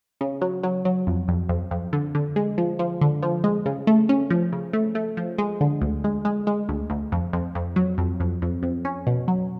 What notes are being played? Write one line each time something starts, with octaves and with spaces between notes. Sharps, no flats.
C#3
F#3
F#3
F#3
F2
F2
F2
F2
D3
D3
G#3
F3
F3
D3
F3
G#3
C#3
A3
C#4
F3
C#3
A3
A3
F3
G#3
D3
D2
G#3
G#3
G#3
D2
D2
F2
F2
F2
F#3
F2
F2
F2
F2
C#4
B2
F#3